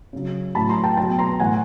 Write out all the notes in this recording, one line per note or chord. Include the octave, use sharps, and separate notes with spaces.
C#3 F#3
A2 F#3 A5 B5
A#5 C6
G5 A5
B2 F#3 G5 A5
A#5 C6
A2 E3 F#5 G#5